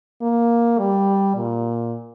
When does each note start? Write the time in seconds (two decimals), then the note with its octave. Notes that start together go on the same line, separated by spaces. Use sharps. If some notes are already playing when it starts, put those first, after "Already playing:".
0.22 A#3
0.79 G3
1.36 A#2